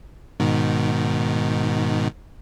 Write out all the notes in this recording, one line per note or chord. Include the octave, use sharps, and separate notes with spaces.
G#2 B2 D#3